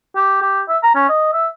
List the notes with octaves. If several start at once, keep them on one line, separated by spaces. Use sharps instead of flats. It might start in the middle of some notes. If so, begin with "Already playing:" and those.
G4
G4
E5
A#5
C#4
D#5
E5